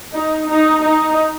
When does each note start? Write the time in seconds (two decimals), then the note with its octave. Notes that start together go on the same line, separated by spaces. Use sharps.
0.13 D#4
0.49 D#4
0.83 D#4